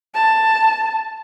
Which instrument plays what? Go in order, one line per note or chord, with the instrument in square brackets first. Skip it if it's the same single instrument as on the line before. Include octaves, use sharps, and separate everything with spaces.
[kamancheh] A5